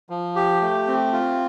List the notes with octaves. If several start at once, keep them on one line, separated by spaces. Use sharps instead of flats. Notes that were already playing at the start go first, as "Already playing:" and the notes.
F3
G4
A3
C4
F4